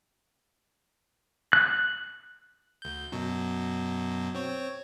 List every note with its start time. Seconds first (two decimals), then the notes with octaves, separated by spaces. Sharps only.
1.53 F#6
2.82 D2 G6
3.12 F#2 B2 F#3
4.35 C4 C#5